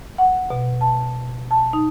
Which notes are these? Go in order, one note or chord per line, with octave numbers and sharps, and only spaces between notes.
F#5
B2
A5
A5
D#4